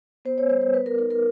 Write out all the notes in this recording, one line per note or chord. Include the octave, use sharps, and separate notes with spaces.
B3 C5
C#5
G3 C5
B4
B3 B4
A#4
B4
D#4 A#4
A#4